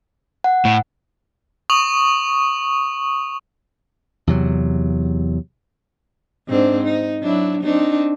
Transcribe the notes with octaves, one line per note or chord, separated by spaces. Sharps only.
F#5
A2
C#6 D#6 F7 F#7
E2 C3 F#3
G#2 C4 D4
D#4
F#3 D4 E4
C4 D4 D#4